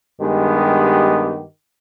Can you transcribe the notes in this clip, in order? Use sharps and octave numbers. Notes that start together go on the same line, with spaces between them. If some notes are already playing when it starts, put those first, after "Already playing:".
G2 D#3 G#3 B3 G4